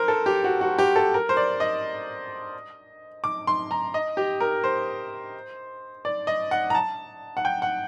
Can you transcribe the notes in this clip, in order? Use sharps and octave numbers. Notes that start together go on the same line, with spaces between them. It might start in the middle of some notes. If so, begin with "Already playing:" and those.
Already playing: A#4 C5
A4
G4
F#4
F#4
G4
A4
A#4
C5
D5
D#5
D6
C6
A#5
D#5
G4
A#4
C5
D5
D#5
F#5
A#5
A5
F#5
G5
F#5